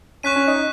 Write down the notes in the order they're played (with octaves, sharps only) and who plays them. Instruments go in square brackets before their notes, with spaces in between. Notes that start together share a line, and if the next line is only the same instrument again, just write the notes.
[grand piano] C#4 [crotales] C#6 F#6 B6 D#7
[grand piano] C#4
D#4